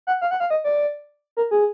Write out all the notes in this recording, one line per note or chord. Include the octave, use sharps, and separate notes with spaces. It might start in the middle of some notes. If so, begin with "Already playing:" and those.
F#5
F5
F#5
F5
D#5
D5
A#4
G#4